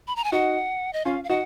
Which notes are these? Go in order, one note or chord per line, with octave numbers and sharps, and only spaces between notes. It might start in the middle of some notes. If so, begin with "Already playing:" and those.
B5
A#5
G#5
D#4 F#4 F#5
D#5
C#4 F4 F5
F5
D#4 F#4 F#5